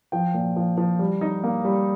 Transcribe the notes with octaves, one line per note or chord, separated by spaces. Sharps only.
F3 G5
A#2
F3
F3
G3
D#4
A#3
G3